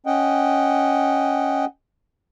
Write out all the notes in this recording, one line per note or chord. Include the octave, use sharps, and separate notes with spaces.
C#4 D#5 F#5 G5